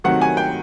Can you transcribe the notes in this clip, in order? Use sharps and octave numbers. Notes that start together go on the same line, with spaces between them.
C3 D#3 F#3 A3 F#5
G#5
G5